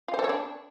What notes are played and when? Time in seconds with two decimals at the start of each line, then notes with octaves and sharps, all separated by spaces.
0.08 F4
0.14 C5
0.19 A4
0.24 C#5
0.29 D4